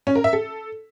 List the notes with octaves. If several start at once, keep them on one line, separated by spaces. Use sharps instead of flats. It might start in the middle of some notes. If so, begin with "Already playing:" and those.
C#4
A#4
E5
A4